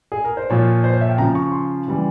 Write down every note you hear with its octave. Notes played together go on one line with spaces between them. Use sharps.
G#4
A#4
C5
A#2 F3 C#5
C5
C#5
E5
G5
C#3 F3 A#5
C#6
C6
C#3 E3 G3